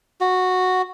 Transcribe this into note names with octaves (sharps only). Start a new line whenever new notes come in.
F#4